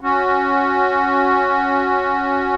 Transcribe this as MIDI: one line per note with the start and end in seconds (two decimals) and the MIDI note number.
0.01 2.55 61
0.01 2.55 66